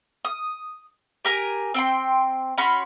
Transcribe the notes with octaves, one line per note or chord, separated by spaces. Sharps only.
D#6
G4 A#4 G#5
C4 G5 C6
C#4 F#4 B5 C6